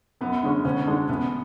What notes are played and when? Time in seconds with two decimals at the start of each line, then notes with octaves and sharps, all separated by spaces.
0.21 F#2 B3
0.43 D3 G#3 C#4
0.65 D2 C#4
0.86 D3 G#3 D4
1.09 A1 B3